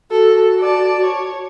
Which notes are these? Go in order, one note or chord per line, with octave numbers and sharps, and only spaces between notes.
F#4 A4
D5 A5
C#5